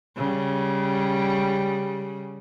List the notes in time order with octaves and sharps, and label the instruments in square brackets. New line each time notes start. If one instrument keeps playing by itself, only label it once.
[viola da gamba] C#3 G3